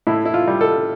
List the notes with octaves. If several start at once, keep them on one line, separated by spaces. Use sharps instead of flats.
A2 E4
E4
F4
G3
A4